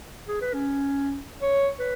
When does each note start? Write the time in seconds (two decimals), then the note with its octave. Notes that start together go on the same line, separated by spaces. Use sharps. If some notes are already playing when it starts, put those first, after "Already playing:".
0.28 G#4
0.41 B4
0.54 C#4
1.42 C#5
1.80 B4